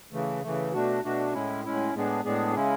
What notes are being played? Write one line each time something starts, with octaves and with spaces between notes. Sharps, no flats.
C#3 E3 A3
C#3 E3 A3
B2 A3 D4 F#4
B2 A3 D4 F#4
A2 G#3 C#4 E4
A2 G#3 C#4 E4
A2 G#3 B3 D4 G#4
A2 G#3 B3 D4 G#4
C#3 G#3 C#4 E4